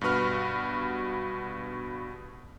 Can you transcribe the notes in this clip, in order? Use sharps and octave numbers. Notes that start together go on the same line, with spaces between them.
G2 B2 F#4 B4 F6